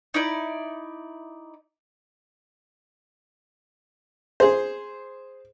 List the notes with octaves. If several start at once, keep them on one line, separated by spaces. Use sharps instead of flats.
D#4 E4 D5
G#4 C5